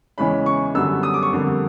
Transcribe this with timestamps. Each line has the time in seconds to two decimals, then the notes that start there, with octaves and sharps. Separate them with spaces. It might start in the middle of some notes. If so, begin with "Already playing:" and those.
0.18 E2 C#3 E3 G#3 C#4 B5
0.46 C#6
0.75 F#2 D3 G3 B3 E6
1.03 D#6
1.14 D6
1.23 C#6
1.33 F2 D3 G3 A#3